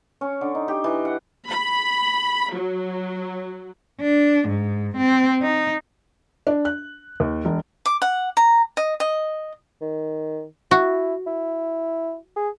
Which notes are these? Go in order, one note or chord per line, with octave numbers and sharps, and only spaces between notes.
C#4
D3
D#4
G4
E3
F#5
B5
F#3
D4
G#2
C4
D#4
D4
F#6
D#2
E1
D6
F#5
A#5
D#5
D#5
D#3
E4 F#4
E4
G#4